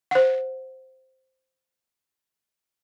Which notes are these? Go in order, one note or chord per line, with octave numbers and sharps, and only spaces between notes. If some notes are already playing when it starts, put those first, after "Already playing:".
C5 F#5